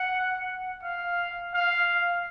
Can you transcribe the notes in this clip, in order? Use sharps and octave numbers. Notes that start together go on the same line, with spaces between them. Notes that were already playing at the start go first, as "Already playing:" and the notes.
Already playing: F#5
F5
F5